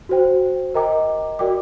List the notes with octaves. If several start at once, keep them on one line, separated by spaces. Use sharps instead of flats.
F#4 C5 G5
A#4 D#5 G5 A#5 D6
F#4 A#4 D5 G5 D6